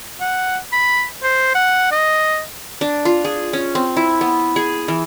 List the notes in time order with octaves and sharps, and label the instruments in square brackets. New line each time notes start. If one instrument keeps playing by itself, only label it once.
[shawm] F#5
B5
C5
F#5
D#5
[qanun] D4
F4
G#4
C#4
C4
E4
B3
G#4
E3